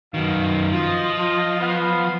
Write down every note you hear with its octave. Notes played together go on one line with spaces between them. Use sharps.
F#2 B2 D#3 F5
F3 F4 D#5
B3 F5